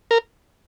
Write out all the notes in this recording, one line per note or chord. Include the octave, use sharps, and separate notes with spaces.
A#4